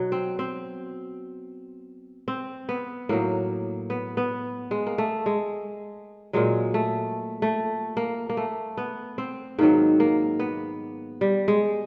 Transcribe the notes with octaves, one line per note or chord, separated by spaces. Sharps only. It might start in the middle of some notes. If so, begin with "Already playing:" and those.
Already playing: B2 F#3
C4
C4
C4
B3
A2 F#3 A#3
B3
B3
G#3
A#3
A3
G#3
A#2 F#3 G#3
A3
A3
A#3
A#3
A3
B3
C4
G#2 D#3 F#3 A#3
A#3
B3
G3
G#3